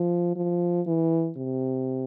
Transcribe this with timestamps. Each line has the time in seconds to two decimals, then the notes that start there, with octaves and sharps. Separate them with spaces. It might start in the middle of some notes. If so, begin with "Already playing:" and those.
Already playing: F3
0.36 F3
0.87 E3
1.37 C3